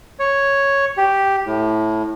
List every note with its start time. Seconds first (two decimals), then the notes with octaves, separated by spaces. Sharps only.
0.19 C#5
0.97 G4
1.46 A2